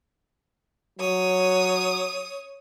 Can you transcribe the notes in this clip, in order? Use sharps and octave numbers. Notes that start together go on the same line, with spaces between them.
F#3 C#5 D#6